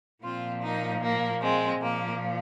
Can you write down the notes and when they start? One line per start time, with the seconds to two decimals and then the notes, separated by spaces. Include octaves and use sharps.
0.24 A#2 F3 C4 F4
0.63 A#3 D#4
1.02 A#3
1.41 G#3 C4
1.81 A#2 F3 A#3